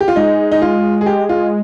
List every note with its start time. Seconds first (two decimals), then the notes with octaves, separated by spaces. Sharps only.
0.01 G4
0.08 F4
0.16 G#3 D#4
0.52 D#4
0.62 F4
1.01 G#4
1.06 G4
1.29 F4